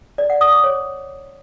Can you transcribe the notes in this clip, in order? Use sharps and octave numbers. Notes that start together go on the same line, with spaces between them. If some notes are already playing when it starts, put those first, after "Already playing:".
D5
F#5
D#6
D6
C#5